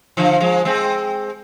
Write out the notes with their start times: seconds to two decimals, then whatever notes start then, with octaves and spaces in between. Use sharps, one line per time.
0.17 D3 F3
0.40 F3 G#3
0.65 G#3 C4